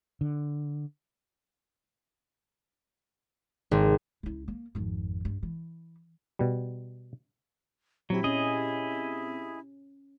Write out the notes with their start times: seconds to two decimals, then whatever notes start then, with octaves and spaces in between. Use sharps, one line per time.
0.21 D3
3.71 G#1
4.23 C#2 E4
4.48 A#3
4.75 G#1 F2
5.25 G2
5.43 E3
6.39 B2 G3
8.10 A#2 F#3 C4 E4 G4
8.24 C#4 G#4 D#5